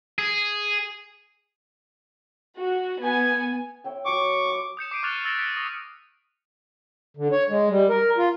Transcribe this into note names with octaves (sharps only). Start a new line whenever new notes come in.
G#4
F#4
B3 G#5
C#5 E5 G5
F#3 G#5 C#6 D6
C6 D#6
D#6 G6 C#7 E7
D6 C7 D7 D#7
C#6 F6 F#6 A6 D#7 F7
E6 A6 A#6 C#7 D7
B6 D7
C#6 D#6 A#6
D3
C#5
G#3
G3
A#4
F4